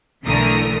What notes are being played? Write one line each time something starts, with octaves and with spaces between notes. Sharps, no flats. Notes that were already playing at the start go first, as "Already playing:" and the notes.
B1 D3 E3 A3 A#4 D#6